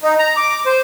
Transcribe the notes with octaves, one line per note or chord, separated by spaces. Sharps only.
D#4
A#5
D6
C5